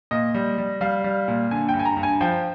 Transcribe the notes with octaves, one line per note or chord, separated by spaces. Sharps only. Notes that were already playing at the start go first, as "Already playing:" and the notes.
A#2 D#5
G3
G3
G3 F5
G3
A#2
D3 G#5
G2 G5
G#5
A#5
G2
G#5
F3 G5